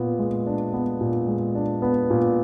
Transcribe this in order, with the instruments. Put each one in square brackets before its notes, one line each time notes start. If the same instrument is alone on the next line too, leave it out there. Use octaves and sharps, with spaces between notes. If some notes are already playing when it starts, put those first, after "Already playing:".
Already playing: [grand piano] A#2 B3
G#3
D4
B3
A#2
G#3
D4
B3
A#2